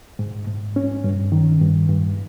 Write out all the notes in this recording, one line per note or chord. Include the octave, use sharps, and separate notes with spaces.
G#2
G#2
C#4
G2
D#3
G2
G2